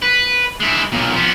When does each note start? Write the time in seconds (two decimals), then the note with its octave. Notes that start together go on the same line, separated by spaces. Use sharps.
0.02 B4
0.60 G#3 E4
0.92 B1 A#2
1.14 F3 B3